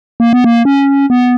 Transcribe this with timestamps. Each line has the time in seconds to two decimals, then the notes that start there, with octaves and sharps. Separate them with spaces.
0.20 A#3
0.33 B3
0.44 A#3
0.65 C#4
1.10 B3